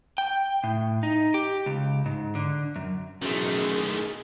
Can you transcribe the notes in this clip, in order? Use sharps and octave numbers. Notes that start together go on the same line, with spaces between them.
G5
A2
D#4
G4
C#2
G#2
D3
F#2
F#2 B2 D#3 E3 G#3 A3 G#4